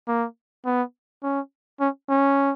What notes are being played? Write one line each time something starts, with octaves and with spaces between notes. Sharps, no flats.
A#3
B3
C#4
C#4
C#4